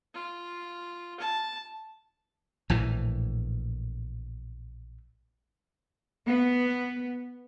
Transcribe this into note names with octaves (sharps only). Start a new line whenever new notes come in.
F4
A5
A#1 A2 E3
B3